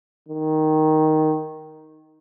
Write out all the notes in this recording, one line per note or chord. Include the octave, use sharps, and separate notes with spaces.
D#3